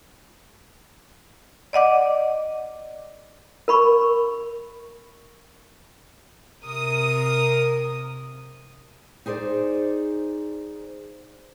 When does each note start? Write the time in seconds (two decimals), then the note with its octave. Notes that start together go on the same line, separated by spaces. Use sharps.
1.73 D5 D#5 F#5 D6
3.68 A#4 B5 C#6
6.63 C3 A#4 D#6
9.26 D#4 G#4 C5 D5